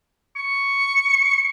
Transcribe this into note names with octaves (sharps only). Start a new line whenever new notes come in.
C#6